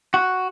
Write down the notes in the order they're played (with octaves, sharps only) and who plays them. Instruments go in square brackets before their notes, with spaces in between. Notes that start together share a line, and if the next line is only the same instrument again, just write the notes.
[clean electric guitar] F#4